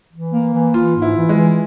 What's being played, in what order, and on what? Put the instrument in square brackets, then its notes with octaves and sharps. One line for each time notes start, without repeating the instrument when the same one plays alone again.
[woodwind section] E3
A#3
E3
[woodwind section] E3 [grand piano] F4
[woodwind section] G#2
[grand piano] E4
[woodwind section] E3
[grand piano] G#3
[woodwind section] E3